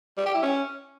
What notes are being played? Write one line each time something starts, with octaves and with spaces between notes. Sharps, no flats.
G3
G4
E4
C#4